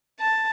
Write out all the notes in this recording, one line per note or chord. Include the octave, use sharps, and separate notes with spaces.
A5